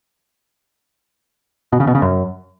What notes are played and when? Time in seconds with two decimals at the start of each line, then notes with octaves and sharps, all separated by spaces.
1.73 B2
1.80 C#3
1.87 B2
1.95 C#3
2.02 F#2